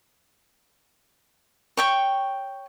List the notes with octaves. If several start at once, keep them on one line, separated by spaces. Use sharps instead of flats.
C#5 G5 C#6